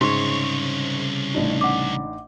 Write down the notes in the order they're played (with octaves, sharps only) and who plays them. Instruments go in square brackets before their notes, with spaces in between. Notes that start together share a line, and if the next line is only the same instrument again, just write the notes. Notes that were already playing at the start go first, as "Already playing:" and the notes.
[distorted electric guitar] C2 C#5 [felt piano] G#2 [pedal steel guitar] C#3 [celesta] C6 C#6
[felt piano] A1 D4 D#4
[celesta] F#5 D6